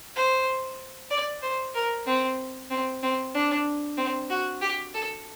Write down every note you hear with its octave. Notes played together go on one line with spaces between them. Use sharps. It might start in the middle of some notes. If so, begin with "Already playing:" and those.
C5
D5
C5
A#4
C4
C4
C4
D4
C4
F#4
G4
A4